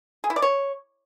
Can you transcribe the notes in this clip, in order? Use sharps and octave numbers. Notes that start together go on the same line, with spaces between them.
G#4
E4
D5
C#5